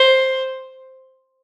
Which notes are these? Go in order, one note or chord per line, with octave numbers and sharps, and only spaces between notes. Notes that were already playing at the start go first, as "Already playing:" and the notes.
Already playing: C5